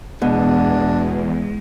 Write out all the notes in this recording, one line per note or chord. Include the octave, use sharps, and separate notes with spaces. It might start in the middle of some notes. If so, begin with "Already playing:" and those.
E2 B2 G#3 D4